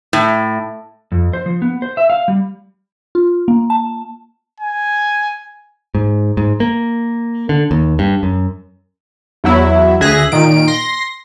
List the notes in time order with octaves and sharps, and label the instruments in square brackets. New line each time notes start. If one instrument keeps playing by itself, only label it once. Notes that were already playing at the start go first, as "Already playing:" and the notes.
[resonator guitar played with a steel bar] A2
[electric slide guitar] F2
C5
F3
B3
C5
E5
F5
G3
[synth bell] F4
A#3
A5
[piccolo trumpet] G#5
[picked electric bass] G#2
G#2
A#3
D3
D#2
G2
F#2
[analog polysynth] E2 F#3 E4
D2 G#4 E5 F#6 A#6
A#2 D#3 D7
C6 A#6